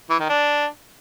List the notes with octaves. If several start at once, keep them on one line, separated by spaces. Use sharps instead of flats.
E3
D#3
D4